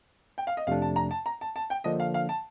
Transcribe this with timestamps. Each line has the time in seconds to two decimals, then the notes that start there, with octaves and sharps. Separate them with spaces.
0.38 G5
0.47 F5
0.57 D#5
0.67 F2 C3 F3 A3 D4 F5
0.82 A5
0.96 A#5
1.11 A5
1.26 A#5
1.41 A5
1.56 A5
1.70 G5
1.84 D3 F3 A#3 D4 D#5
2.00 F5
2.14 F5
2.29 A5